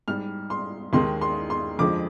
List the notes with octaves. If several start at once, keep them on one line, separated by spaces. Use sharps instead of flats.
G#2 G3 F6
C6
D#2 D#3 G#3 C6
C6
C6
F2 D3 F3 G#3 D6